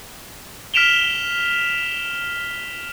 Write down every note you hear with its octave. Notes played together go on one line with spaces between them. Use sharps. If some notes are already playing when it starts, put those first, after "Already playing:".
F6 B6 D7 E7 F7 G7